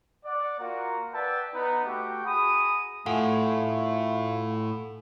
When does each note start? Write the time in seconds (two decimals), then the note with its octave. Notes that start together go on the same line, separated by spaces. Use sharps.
0.25 D5 F#5
0.59 A#3 F4 F#4 A#4 F#5 A#5
1.13 B4 D5 E5 F#5 G5 A5
1.54 B3 D#4
1.85 A3 F#4 G4 F#5 G5
2.25 F#4 G#4 A#5 B5 D#6
3.06 A2 A3 F4 A4 F#5 G#5